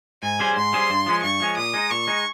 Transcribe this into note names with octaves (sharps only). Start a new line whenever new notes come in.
G#2 G#5
G3 C#4 G#4 C5
G#2 C6
G3 C#4 G#4 C5
G2
F3 G#3 C#4
G2 C#6
F3 G#3 C#4
A#2 D#6
G#3 D#4
A#2 C#6
G#3 D#4